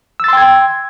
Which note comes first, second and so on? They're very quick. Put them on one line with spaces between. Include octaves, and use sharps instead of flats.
E6 A6 C6 G5 G#6